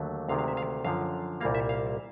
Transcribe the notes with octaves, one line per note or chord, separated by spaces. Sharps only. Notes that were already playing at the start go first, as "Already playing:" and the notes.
Already playing: D#2 D3 F#3 A3
D2 C3 D#3 G#3 F5
F5
E5
F5
F#2 D3 F3 F5
C2 A#2 G3 A#3 F5
E5
F5